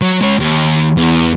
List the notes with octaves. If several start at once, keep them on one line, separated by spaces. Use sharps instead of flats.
F#3
G#3 C#5
D#2
E2